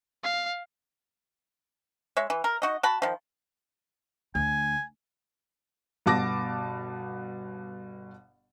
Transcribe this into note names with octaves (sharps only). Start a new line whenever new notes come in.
F5
G#3 C#5 E5
E3
A#4
D#4 F#4 D#5
F#4 A5 B5
D#3 F3
D2 G#5
G1 B2 A5 D6 A#6